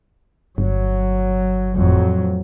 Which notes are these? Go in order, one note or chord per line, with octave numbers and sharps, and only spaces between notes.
G1 F#3
F2 A2 F#3